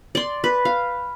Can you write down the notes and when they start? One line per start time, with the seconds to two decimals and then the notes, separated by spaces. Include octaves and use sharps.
0.15 D5 C6
0.44 B4
0.65 F5